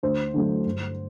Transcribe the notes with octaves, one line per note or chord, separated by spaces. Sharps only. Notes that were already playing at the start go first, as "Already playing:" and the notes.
D2 C5
D3 F#3 A3
G1